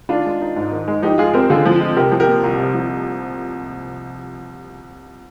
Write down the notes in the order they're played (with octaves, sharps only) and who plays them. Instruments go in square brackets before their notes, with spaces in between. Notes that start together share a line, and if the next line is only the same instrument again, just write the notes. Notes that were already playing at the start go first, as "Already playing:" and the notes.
[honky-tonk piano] D#3 [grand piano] D4 F4
[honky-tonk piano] G#3
D#4
G#2
D#3
G#3
[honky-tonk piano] F3 [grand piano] D#4 G4
[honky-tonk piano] G#3 [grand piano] F4 G#4
[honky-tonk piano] C4 [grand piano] G4 A#4
[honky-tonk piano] D3 [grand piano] F4 G#4
[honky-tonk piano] F3
G#3
[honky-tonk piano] C3 [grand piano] G4 A#4
[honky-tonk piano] F3
[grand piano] G4 A#4
[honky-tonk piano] A#3
C2
C3
F3